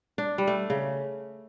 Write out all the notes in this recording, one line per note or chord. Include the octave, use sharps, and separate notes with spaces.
D4
G3
A3
C#3